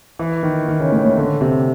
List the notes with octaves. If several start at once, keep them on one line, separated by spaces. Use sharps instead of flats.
E3
D#3
D#3
C#3
A2
A2
D3
C3